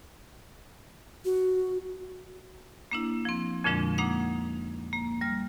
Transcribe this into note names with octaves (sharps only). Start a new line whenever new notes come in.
F#4
A#3 D4 E4
F3 C4
F2 A#2 D3 F3 G#3 D4
A#3 D#4 F#5 D6
A#3
G3 F6